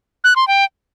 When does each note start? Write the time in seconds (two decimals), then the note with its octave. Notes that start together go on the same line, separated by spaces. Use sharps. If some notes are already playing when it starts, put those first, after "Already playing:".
0.24 F#6
0.36 C6
0.48 G5